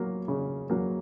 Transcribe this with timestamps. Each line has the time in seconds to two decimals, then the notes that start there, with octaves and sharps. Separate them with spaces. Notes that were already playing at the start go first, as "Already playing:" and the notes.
Already playing: F#3 A#3
0.28 C#3
0.70 F#3 A#3